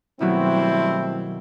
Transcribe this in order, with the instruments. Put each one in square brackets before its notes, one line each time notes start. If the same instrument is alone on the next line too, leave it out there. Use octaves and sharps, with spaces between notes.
[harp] B2 D#3 F#3 [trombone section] G3 A3 C4 [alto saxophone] E4